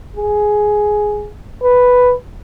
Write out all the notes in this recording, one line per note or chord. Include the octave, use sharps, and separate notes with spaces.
G#4
B4